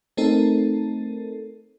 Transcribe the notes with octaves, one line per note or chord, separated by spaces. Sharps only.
A3 C4 D#4 A4 A#4